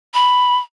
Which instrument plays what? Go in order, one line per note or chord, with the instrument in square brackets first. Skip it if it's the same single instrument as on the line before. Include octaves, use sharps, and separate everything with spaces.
[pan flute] B5